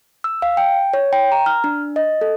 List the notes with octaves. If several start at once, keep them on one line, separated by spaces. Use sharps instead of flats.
E6
F5
G5
C#5
G5
A#5
F6
D4
D#5
A4